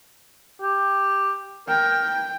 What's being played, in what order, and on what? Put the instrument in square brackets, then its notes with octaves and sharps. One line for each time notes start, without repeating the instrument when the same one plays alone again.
[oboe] G4
[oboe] A#4 [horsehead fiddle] G5